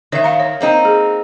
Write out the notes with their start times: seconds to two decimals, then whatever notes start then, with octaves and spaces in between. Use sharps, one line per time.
0.12 D#3 C#5 E5
0.24 F5 A#5
0.40 C#5
0.61 A#3 C4 D#4
0.85 G#4